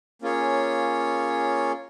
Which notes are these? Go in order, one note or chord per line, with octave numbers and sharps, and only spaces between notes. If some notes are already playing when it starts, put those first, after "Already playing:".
A#3 C#4 F4 G#4 C#5